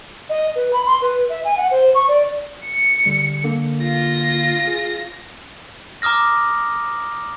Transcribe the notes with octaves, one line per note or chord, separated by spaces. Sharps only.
D#5
B4
B5
C6
B4
E5
G#5
F#5
C5
C#6
D5
C#7
D3 G3
D3 A#3
F4 A#6
G#4
A#5 D6 D#6 F6 A#6